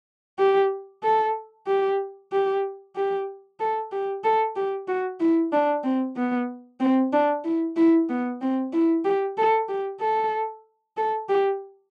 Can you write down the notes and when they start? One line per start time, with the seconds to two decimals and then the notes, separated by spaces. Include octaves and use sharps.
0.39 G4
1.03 A4
1.67 G4
2.32 G4
2.96 G4
3.60 A4
3.92 G4
4.24 A4
4.56 G4
4.88 F#4
5.20 E4
5.52 D4
5.84 C4
6.16 B3
6.80 C4
7.13 D4
7.44 E4
7.76 E4
8.09 B3
8.41 C4
8.73 E4
9.05 G4
9.37 A4
9.69 G4
10.01 A4
10.97 A4
11.29 G4